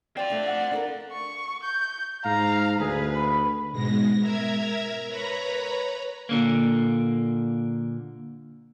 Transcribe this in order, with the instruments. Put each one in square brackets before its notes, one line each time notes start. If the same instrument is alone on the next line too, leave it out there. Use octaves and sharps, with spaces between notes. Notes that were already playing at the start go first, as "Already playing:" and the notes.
[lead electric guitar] C4 F4 [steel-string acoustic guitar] F#4 G5 [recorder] D5
[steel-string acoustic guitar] A3 D4
[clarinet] F#5
[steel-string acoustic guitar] D4 A4 A#4
[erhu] C#6
G6
[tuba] G#2 [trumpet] F5 [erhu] A#5
[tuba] D2 [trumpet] G#4 [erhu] B4
[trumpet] B5
[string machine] G#2 B2 G#3 A#6
A#4 E5 A#5 G#6
B4 C#5 A#5 B5
[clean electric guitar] A#2 D3 A#3